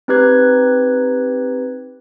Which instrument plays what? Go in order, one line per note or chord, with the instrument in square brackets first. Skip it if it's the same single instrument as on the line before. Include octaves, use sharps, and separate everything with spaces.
[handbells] C4 D#4 G4 B4 F#6 G#6